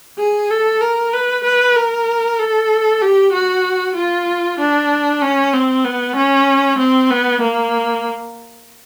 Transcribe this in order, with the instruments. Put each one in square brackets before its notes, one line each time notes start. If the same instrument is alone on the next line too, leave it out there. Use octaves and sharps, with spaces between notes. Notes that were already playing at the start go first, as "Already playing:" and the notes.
[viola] G#4
A4
A#4
B4
B4
A#4
A4
G4
F#4
F4
D4
C#4
C4
B3
C#4
C4
B3
A#3